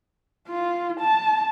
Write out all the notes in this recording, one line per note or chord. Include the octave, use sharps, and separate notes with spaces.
F4
A5